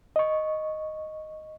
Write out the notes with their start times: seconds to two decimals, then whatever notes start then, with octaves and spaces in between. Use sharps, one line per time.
0.16 D#5 C#6